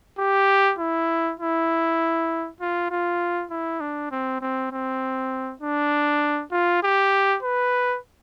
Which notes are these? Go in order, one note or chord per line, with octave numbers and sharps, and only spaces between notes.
G4
E4
E4
F4
F4
E4
D4
C4
C4
C4
D4
F4
G4
B4